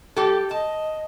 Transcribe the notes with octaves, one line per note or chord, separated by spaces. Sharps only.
G3 G4 A4
D#5 A5